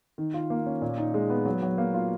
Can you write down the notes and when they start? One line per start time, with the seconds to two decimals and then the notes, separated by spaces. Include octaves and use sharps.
0.18 D#3
0.34 F4
0.50 A#3
0.66 C#4
0.82 A#2
0.98 D#4
1.14 G#3
1.30 B3
1.46 F#3
1.62 F#3
1.78 A#3
1.94 F4